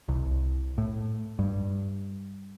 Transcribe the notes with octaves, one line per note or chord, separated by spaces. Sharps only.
C2
A2
G2